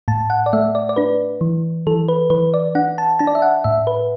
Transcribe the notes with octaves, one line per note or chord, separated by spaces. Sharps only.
A2 A5
F#5
D5
A3 E5
D5
D5
D4 B4
E3
E3 A4
B4
E3 B4
D5
D4 F#5
A5
D4 A5
D5
E5
F#5
A2 E5
B4